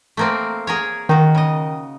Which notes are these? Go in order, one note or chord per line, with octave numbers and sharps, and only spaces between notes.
A3 A#3 C4
G#4 A#4 C#5
D#3 D#4 F#4
C#3 D#5